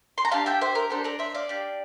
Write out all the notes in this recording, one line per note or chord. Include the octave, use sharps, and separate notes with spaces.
C6
A#5
D4 G4 F5 A5
E5 G5
C5 E5
A#4
D4 G4 A4 C5
A#4 D5
C5 E5
D5 F5
D4 G4